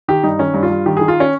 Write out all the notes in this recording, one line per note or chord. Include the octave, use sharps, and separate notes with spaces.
D#3 G4
G2 D#4
D#3 C#4
G2
F4
G2
D#3 G4
D#3 G#4
F4
C#4